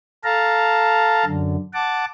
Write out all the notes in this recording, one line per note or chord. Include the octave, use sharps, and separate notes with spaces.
A4 F5 A5 A#5
F#2 D3
F#5 A5 D6